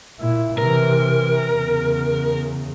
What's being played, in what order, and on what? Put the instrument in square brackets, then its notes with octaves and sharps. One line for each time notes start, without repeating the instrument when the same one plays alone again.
[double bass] A#2 E4
[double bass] C3 E3 [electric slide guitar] A#4
[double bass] E2 C#3